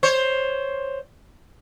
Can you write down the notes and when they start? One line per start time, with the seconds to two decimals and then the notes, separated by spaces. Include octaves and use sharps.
0.03 C5 C#5